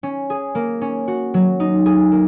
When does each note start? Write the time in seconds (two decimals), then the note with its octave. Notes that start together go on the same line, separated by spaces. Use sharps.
0.03 C#4
0.30 G#4
0.55 A#3
0.81 C#4
1.08 F#4
1.34 F#3
1.60 D#4
1.86 G#4
2.12 A#3